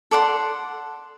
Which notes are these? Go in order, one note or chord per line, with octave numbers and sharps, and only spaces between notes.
A4 D5 F#5 C6